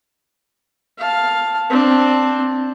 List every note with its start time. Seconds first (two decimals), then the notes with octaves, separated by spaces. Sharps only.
0.99 F5 A5
1.70 C4 D4